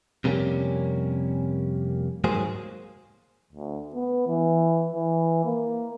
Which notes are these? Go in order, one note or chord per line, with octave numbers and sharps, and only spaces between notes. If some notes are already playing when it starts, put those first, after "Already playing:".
F2 C3 G3 A#3 C#4
G#2 F#3 A#3 G#4 C5
D2
B3
E3
E3
A#3